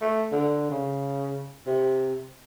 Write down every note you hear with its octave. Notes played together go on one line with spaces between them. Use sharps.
A3
D3
C#3
C3